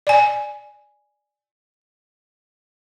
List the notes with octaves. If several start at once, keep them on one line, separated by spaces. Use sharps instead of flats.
D5 G#5